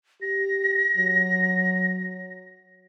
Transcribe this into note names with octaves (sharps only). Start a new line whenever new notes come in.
G4 A#6
F#3